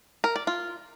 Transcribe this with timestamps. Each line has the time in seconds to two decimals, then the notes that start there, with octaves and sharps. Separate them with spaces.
0.24 A#4
0.36 D5
0.47 F4